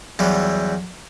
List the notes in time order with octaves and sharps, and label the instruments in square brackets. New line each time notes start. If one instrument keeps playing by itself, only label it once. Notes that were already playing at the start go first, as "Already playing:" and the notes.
[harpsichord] E2 E3 F#3 G3